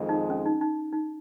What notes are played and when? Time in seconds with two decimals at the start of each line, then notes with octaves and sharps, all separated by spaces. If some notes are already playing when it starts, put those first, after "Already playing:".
Already playing: F2 D#3 G#3
0.09 D#4
0.30 C#4
0.46 D#4
0.61 D#4
0.93 D#4